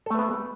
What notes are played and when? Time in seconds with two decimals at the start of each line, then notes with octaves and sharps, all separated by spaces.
0.06 A4
0.10 A3
0.15 B4
0.19 B3